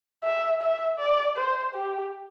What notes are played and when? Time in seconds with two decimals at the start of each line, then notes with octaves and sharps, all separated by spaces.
0.24 E5
0.61 E5
0.99 D5
1.37 C5
1.74 G4